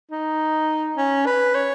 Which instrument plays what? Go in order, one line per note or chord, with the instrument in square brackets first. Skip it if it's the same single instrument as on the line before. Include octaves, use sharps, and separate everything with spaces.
[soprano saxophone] D#4
C#4
B4
C#5